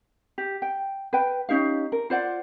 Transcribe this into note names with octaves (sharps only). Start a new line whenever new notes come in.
G4
G5
B4 G5
C#4 D#4 G4 F5
A#4
F4 C5 D5 F#5